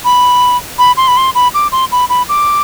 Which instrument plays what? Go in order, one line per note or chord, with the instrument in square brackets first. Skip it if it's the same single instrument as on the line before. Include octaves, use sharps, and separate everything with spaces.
[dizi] B5
B5
C6
B5
C6
B5
D6
C6
B5
B5
D6